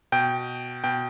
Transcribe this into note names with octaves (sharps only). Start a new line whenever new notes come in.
B2 G5
B2 G5